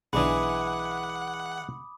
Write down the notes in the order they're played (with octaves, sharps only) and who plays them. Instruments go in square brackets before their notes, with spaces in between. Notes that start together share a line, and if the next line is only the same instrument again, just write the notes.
[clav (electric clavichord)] B1 D4 [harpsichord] E3 G#3 [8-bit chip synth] F#5 [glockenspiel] B5 D6 D#6